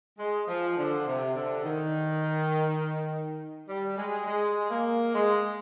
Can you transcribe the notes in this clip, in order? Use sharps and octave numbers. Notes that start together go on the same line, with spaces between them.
G#3
F3
D3
C3
D3
D#3
G3
G#3
G#3
A#3
G#3